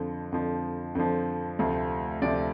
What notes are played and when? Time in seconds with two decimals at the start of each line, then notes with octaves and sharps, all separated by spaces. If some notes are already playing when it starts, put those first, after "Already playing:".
Already playing: F2 D3 F3
0.32 F2 D3 F3
0.95 F2 D3 F3
1.59 D2 C3 F3
2.22 D2 C3 F3 D5